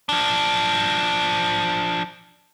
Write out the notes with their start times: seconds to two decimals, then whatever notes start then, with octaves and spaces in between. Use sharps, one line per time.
0.09 F3 D4